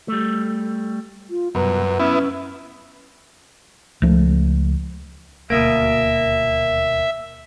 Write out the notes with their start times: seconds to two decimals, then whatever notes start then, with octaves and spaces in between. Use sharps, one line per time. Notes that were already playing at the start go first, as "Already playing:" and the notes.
0.08 G3 A3
1.30 F4
1.55 C2 F#2 B2 A#4 B4
2.00 B3 C#4 E4 E5
4.02 C#2 F3 A3
5.50 D#1 D2 B2 A#3 E5